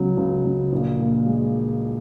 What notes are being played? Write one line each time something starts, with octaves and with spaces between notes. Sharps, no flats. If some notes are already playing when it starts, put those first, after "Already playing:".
Already playing: C#2 F#3 B3
C#2
C#2
A#1
A#2
G#3